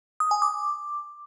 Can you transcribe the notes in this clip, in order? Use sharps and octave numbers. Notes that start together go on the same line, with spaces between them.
D#6
G#5
D6